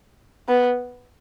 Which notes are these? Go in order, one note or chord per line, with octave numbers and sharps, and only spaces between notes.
B3